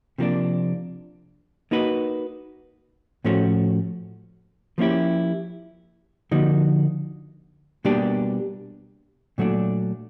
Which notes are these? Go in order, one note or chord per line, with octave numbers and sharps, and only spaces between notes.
C3 F3 A#3 D4
A#3 D#4 F#4 B4
A2 F3 A3 C#4 F#4
F3 A#3 C#4 E4 G4
D3 F3 A#3 D#4 F#4
B2 G3 A#3 D4 G4
A#2 F#3 A3 D4